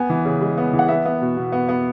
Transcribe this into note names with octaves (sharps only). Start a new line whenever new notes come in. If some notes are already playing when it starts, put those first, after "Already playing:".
Already playing: B3 G#5
E3
C#3
G#3
B3
E3
F#5
B3 E5
B3
B2
B2
B3
B3